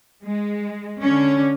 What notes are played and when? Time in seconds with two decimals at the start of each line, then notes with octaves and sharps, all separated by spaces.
0.23 G#3
1.01 D3 C#4